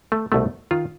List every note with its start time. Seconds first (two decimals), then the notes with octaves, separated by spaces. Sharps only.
0.12 A3
0.32 C2 B2 A3
0.71 D#3 F4